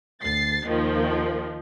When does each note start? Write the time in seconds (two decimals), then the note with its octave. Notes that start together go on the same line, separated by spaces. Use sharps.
0.21 D2 A6 C7
0.67 D#2 D#3 F3